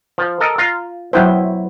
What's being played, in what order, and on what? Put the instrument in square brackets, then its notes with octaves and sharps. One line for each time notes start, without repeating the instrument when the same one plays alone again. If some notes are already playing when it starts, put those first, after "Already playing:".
[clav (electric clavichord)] F3
A4 A#4 D#5
F4 A#5
[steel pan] F#3 E4 C5 [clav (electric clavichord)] B3 G5